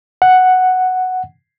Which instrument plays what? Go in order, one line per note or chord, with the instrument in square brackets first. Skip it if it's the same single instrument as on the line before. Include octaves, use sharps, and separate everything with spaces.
[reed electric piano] F#5